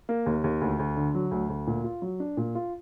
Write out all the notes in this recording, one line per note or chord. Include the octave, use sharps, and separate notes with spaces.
A#3
D#2
D#2
D2
D2
D3
F#3
D2
D2
A#2
F4
F#3
D4
A#2
F4